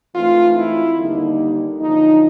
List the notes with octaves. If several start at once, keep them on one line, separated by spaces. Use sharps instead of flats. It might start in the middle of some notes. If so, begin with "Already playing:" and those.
G#2 E3 A3 C4 D#4 F4
E4
D#2 D3 G3 A#3 D#4
F#2 D3 F3 D#4